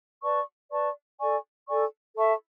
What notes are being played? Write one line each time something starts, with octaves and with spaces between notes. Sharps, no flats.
B4 D5 A5 C#6
B4 D5 A5 C#6
A4 D5 G#5 C#6
A4 D5 G#5 C#6
A4 E5 A5 C#6